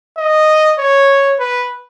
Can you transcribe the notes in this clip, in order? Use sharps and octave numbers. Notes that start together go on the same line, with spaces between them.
D#5
C#5
B4